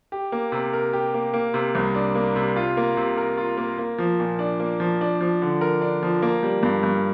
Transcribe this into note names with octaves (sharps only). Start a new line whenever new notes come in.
G4
A#3
C3
A#4
G4
A#3
A#3
C3
C2
D4
A#3
C3
F4
A#3
C3
A#4
F4
A#3
A#3
F3
A#2
D4
A#3
F3
D4
F3
D3
A#4
D4
F3
A#3
G3
G2
G2